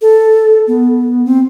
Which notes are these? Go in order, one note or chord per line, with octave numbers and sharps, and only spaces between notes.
A4
B3
C4